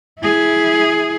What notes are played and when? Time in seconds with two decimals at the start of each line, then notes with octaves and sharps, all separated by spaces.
0.20 E4 G#4